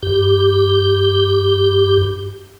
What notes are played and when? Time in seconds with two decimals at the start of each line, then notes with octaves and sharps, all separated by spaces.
0.03 G2 G4